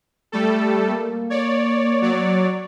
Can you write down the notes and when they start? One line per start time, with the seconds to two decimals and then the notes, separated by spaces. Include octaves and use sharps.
0.32 G3 A3 A4
0.88 A#3
1.30 C#5 D5
2.02 F#3 C#5 D5